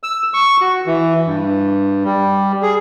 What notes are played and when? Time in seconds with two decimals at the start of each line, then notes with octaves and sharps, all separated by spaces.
0.03 E6
0.34 C#6
0.61 F#4
0.86 E3
1.27 G2
2.04 G3
2.63 G#4